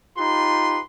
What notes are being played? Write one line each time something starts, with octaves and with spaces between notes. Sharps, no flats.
D#4 F4 G4 B4 C6